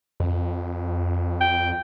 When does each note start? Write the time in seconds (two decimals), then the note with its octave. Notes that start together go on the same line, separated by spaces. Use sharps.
0.20 F2
1.41 G5